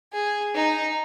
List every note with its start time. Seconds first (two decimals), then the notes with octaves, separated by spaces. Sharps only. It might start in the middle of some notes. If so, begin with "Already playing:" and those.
0.13 G#4
0.55 D#4